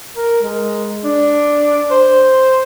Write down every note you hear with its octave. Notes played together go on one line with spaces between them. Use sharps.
A#4
G#3
D4
C5